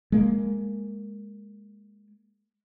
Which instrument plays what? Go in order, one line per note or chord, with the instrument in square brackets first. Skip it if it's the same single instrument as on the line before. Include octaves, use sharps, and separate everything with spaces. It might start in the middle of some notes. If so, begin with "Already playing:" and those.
[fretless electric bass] G#3 A#3